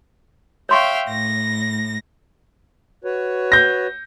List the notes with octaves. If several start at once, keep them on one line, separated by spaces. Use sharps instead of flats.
C#5 E5 F5 G5 C6 C#6
A2 A#6
F#4 B4 C#5
G6 A#6